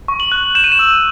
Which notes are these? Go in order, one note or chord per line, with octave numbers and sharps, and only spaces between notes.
C#6
F#7
F#6
G6 E7
D#7
E7
E6